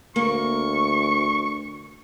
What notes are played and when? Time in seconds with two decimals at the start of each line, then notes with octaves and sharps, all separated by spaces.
0.16 D2 A#3 C#6